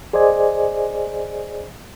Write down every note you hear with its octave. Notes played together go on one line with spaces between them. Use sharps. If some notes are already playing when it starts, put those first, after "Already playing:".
G#4 C5 D5 D#5 G#5